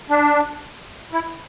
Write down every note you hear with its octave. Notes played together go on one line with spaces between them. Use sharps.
D4
E4